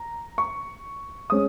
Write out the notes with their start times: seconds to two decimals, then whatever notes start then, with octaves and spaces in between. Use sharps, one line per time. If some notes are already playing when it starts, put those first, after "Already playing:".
Already playing: A#5
0.38 C#6
1.30 G#3 C#4 D#6